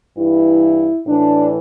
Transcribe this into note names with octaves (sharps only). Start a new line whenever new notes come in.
G2 E3 E4
A2 E3 D4